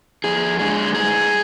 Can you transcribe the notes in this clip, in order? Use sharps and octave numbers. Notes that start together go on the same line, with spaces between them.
F2 G#4
D3 G#3 D4 G#4
G2 G#4